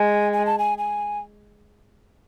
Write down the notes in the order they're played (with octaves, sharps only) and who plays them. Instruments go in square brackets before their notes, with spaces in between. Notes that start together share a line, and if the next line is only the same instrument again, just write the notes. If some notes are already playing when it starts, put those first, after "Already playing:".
Already playing: [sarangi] G#3 [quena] G#5
[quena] G#5
A5
G#5
G#5